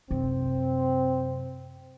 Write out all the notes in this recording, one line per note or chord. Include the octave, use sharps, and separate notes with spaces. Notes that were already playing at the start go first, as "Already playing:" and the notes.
F#2 C3 C4